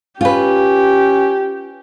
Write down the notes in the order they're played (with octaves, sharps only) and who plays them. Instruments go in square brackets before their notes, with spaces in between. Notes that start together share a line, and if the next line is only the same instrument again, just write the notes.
[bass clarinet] C#4 [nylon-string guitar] F4 B4 [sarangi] G4